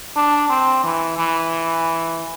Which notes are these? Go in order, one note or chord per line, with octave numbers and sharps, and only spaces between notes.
D4
C4
E3
E3